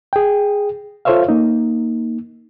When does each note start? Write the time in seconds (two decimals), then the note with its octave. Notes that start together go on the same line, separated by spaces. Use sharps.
0.13 G#4 G5
1.05 F4 A4 C5 C#5 E5 F5
1.29 A#3 D#4